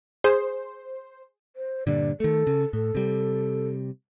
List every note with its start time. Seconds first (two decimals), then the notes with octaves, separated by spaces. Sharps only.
0.24 G#4 C5
1.56 C5
1.87 G2 A#2 D3 D5
2.20 D#3 A3 A4
2.47 C#3
2.73 A2 A4
2.95 C3 G3